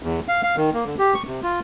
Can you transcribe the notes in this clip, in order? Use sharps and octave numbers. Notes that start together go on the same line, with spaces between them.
E2
F5
F5
D#3
A#3
D3
G4
C#6
C3
F4